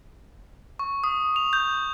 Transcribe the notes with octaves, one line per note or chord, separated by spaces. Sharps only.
C#6
D#6
F7
G6